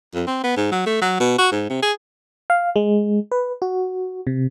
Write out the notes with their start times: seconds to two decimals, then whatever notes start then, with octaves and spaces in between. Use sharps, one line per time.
0.14 F2
0.27 C4
0.43 B3
0.56 G#2
0.72 F#3
0.86 A3
1.02 F#3
1.20 B2
1.38 F#4
1.52 G#2
1.70 C3
1.82 G#4
2.50 F5
2.76 G#3
3.31 B4
3.62 F#4
4.27 C3